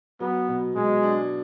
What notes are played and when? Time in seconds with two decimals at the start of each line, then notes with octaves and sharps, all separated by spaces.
0.20 F#3 B3
0.48 B2
0.76 B2 G#3
1.03 D4